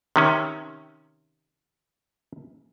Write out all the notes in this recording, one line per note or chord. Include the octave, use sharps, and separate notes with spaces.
C3 D#3 C#4